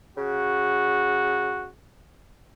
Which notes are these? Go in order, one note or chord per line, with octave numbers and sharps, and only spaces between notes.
C#3 F#4